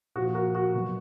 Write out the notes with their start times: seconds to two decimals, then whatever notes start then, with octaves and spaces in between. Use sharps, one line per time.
0.15 A#2 F3 F#4
0.35 F#4 A#4
0.55 F#4
0.74 B2 F#3